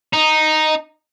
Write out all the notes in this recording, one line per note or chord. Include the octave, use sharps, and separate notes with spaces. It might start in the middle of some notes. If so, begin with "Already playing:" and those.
D#4